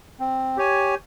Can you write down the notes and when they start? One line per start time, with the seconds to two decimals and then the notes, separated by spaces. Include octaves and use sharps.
0.20 C4
0.57 G4 C#5 G#5